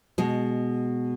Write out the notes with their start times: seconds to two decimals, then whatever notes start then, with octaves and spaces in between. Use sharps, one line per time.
0.18 B2 G#3